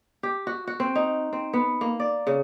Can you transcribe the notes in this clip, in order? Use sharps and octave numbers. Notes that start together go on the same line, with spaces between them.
G4
F#4
F#4
C4
D#4
C4
B3
A#3
D5
C#3